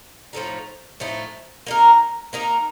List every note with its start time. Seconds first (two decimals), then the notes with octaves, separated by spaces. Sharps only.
0.33 A2 F3 A3 D#4
1.00 A2 F3 A3 D#4
1.66 A#3 D#4 A#4
2.33 A#3 D#4 A#4